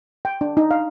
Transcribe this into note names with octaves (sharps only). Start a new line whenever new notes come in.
G5
D4
D#4
F5